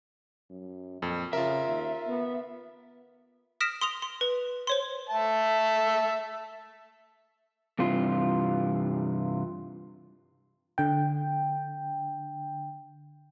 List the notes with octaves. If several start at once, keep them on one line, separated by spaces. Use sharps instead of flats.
F#2
F2 A#2
C#3 F4 A#4 E5
D#2
B3
D#6 F6 A#6 B6 D7 E7
C6 D#6 F7
C6
B4
C5 C#5 C6
E5 A5
G2 C3 E3 F4
D3 G5